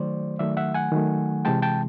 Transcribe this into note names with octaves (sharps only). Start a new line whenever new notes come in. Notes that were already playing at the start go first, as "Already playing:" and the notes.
Already playing: D#3 F#3 A3 C5 D5
D#3 F#3 A3 D5 E5
E5 F#5
F#5 G#5
D#3 F#3 A3
C3 E3 G#3 G5 A5
G5 A5